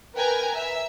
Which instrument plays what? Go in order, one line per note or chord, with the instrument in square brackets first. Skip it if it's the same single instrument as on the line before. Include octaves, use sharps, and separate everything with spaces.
[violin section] A#4 B4 G5 G#5 A#5
E5